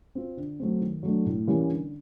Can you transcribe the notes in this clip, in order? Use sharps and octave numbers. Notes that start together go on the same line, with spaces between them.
C4 F4
D3
F#3 A3 C4
D#3
F#3 A3 D4
A2
E3 G3 A#3 C#4
D3